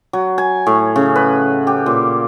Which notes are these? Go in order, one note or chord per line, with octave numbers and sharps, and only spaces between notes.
F#3
G#5
A2
C#3
B4
G4
A#2